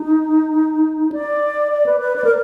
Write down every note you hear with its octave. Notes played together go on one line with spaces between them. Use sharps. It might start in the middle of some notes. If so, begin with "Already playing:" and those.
Already playing: D#4
D5
D5
B4
B4
D5
A#4